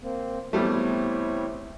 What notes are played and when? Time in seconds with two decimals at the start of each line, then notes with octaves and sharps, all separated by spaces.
0.03 A#3 C4
0.53 E2 G3 A3 C4 E4 C#5